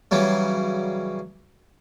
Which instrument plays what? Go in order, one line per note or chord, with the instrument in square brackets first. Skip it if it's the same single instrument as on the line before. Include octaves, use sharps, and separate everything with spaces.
[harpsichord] C#3 E3 F#3 G3